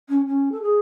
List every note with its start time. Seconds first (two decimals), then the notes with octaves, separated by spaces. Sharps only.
0.09 C#4
0.27 C#4
0.52 A4
0.62 G#4